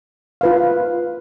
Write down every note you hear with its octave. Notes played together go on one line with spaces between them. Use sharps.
F4 B4 F5